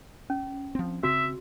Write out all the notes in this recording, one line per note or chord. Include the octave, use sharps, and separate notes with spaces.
C#4
F3 C4
C#3 C4 F#4 E5